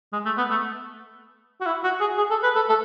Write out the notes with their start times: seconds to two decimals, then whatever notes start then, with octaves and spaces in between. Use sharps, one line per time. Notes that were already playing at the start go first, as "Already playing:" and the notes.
0.13 G#3
0.25 A3
0.37 B3
0.51 A3
1.61 F#4
1.66 E4
1.84 F#4
2.01 G#4
2.18 G#4
2.31 A4
2.43 B4
2.55 A4
2.69 A4